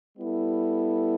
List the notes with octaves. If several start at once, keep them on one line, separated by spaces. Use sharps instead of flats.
G3 B3 E4 A4